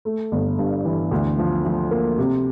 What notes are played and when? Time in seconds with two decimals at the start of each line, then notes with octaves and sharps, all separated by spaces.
0.05 A3
0.32 G1
0.59 G2
0.85 E3
1.11 D2
1.38 F3
1.65 F3
1.91 A#3
2.18 C3